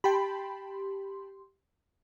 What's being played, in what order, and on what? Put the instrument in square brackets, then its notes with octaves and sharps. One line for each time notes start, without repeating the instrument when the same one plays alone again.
[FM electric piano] G4 C6 [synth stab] G5 A5 B5